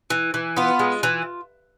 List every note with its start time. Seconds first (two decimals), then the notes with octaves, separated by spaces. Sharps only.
0.10 E3
0.34 E3
0.57 B3 F4
0.79 G#3
1.03 E3